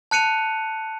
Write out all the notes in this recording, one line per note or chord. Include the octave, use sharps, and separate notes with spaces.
A5 F#6 C#7 D#7 F7